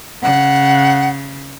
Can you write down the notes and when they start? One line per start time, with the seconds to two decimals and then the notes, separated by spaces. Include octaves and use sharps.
0.22 C#3 F#5